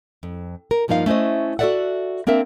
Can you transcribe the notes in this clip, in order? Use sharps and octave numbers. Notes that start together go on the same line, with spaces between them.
F2
A#4
G2 F3 A#3 D#4 F5
A3 C#4 E4 C5 D#5
F#4 A4 C5 D5 E5 F#5
A#3 C4 D4 A#4 E5